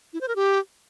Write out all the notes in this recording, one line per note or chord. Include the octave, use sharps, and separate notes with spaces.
E4
C5
A#4
G4